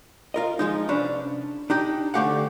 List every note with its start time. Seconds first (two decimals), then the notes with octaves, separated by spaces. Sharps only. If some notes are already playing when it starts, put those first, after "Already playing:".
0.34 F4 A#4 D#5
0.59 F3 G#3 D#4
0.88 C2 C#4 D4 B4
1.70 D4 D#4 G4
2.14 D2 D3 A3 G4 F5 F#5